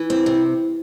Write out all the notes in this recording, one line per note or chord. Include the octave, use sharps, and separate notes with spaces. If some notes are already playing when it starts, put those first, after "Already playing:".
Already playing: E3
C4
C3